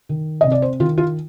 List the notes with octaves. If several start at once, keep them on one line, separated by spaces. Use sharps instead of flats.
D#3
C3 D#5
D5
C5
D#3 F4
F4